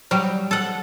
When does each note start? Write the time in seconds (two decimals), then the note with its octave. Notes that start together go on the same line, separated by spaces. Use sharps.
0.11 F#3 G3
0.51 A4 F#5